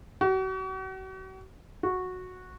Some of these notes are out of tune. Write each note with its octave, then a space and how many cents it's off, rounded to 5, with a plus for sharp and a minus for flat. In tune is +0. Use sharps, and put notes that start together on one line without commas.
F#4 +40
F#4 -10